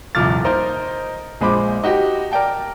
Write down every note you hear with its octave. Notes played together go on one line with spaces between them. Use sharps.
D#1 C2 F2 D6 F6 A6
D#4 A#4 C5 D#5
A#1 G#3 C5 B5 D6
D#4 F#4 G4
A#4 D5 G5 A5